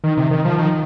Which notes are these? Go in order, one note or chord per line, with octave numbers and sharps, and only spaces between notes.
D#3
C3
D#3
F3
D#3